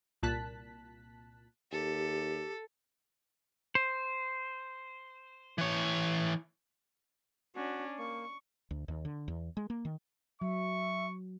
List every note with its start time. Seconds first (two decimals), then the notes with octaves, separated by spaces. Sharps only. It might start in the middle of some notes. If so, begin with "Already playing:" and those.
0.23 C2 A#2 A5 F#6 B6
1.72 D#2 G4 A4
3.75 C5
5.58 E3 C#5
7.56 C#4 D4 F#4
7.99 A#3 C#6
8.71 D2
8.88 D#2
9.05 D3
9.28 E2
9.57 G#3
9.70 A#3
9.85 D#3
10.41 F#3 E5 C#6